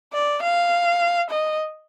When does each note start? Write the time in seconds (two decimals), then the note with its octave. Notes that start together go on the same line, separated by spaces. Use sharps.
0.13 D5
0.42 F5
1.30 D#5